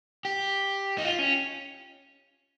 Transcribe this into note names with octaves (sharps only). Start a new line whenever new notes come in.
G4
D#4
F4
C#4